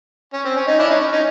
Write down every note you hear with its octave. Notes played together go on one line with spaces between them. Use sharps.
C#4
C4
C#4
C#4 D#4
D4 E4
C#4 D#4
C#4
C#4 D#4